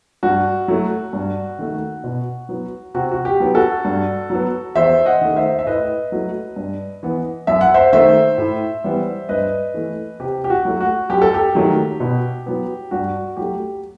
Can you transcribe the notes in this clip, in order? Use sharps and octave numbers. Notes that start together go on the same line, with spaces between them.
G2 F#4
F#3 A3
G2
D#3 A3
B2
F#3 B3
C3 F#4
F#4
G4
F#3 B3
F#4 A4
G2
F#3 B3
E2 C5 E5
D#5 F#5
D#3 A3
C5 E5
E5
A2 B4 D#5
F#3 A3
G2
E3 B3
F#2 E5
F#5
C5 E5
D#3 A3 C5 E5
A2
E3 G3 B3
G2 B4 D#5
E3 A3
C3 G4
G4
F#4
F#3 A3
F#4
F#2 G4
A4
G4
D#3 F#3 A3
B2
F#3 B3
G2 F#4
F#3 A3 G4